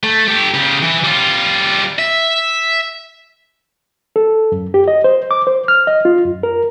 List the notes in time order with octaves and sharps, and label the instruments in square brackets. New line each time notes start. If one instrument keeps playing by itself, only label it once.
[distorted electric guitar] A3
G4 A4
C#3 G4
E3
G3 F4
E5
[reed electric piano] A4
F#2
G4
D#5
C5
D6
C5
F6
D#5
F4
F#2
A#4